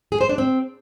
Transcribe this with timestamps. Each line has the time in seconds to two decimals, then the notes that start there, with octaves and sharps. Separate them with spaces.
0.12 G#4
0.21 C5
0.29 D4
0.38 C4